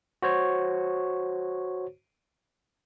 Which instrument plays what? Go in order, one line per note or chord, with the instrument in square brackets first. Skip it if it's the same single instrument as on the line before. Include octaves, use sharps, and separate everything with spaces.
[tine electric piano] F#4 C5 C#5